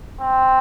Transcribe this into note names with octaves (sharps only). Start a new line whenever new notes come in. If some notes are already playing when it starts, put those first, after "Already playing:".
C4